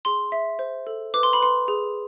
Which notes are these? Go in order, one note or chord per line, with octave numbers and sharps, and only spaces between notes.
G#4 C6
E5
C5
A4
B4 D6
C6
B5
B4 C6
G#4